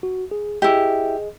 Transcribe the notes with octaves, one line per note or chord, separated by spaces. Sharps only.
F#4
G#4
E4 G4 G#4 D#5